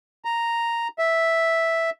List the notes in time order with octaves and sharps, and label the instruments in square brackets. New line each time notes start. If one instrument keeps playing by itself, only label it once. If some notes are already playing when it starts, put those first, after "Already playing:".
[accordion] A#5
E5